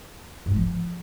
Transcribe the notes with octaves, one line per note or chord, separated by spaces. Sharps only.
G#2
A3
F3